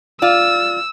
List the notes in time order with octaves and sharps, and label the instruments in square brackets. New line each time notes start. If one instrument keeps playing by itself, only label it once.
[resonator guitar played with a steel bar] F4 D5 [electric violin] E6